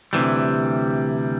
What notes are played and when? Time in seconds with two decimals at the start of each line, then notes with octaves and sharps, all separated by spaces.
0.13 D2 C3 E3 G3